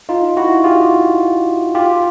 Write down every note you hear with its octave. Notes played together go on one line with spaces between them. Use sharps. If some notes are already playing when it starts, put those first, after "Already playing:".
D#4 F4
E4 F#4
F4 G4
F4 G4